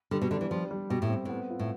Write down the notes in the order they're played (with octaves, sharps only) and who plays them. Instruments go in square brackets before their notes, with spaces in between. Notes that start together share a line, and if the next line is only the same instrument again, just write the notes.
[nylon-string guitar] D3 [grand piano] G3
[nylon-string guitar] B2
[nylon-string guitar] D3 [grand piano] D4
[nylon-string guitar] E3
[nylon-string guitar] F3 [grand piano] G3
[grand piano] G3
[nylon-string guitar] B2 [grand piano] G4
[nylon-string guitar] A2
[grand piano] C4
[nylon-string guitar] A2 [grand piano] B3
[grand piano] F4
[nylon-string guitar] A2